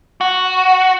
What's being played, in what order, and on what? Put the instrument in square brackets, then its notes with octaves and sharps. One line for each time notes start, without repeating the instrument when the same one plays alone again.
[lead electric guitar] F#4